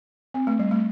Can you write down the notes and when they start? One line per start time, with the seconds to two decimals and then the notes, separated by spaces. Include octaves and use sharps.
0.34 C4
0.47 A3
0.59 G3
0.71 A3